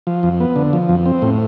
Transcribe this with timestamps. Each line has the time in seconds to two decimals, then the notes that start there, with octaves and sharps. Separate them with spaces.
0.07 F3
0.23 F2
0.40 B3
0.56 D3
0.73 F3
0.89 F2
1.06 C4
1.22 A2